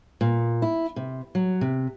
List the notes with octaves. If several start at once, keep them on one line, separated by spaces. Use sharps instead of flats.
A#2
E4
C3
F#3
C3